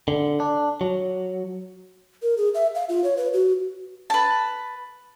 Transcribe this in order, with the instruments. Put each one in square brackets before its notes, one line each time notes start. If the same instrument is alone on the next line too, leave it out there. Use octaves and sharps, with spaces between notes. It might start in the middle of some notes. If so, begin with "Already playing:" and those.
[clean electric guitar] D3
D4
F#3
[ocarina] A#4
G#4
E5
F5
F4
C#5
B4
F#4
[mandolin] B4 A5